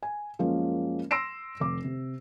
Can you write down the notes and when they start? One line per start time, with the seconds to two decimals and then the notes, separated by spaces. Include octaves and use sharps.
0.03 G#5
0.39 F#2 F3 G#3 A#3 C#4 F4
1.11 C6 E6 A#6 C7 D7 E7
1.60 F1 D6
1.84 C3